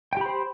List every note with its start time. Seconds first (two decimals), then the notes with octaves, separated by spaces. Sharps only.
0.13 G5
0.17 G4
0.21 B5
0.25 C5